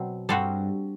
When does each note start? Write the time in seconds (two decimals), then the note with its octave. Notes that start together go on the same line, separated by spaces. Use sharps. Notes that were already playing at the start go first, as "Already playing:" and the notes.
Already playing: B2 F#3 C4
0.29 G2 G3 C4 F#4 A4